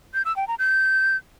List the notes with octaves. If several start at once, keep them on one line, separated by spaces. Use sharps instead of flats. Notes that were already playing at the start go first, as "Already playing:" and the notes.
G6
E6
G5
A#5
G6